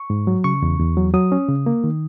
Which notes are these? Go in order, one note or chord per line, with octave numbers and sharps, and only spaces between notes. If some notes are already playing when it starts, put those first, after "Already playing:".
Already playing: C#6
G#2
F#3
C#3 C#6
E2
E2
F#3
F#3 D#6
C#4
C#3
A#3
D#3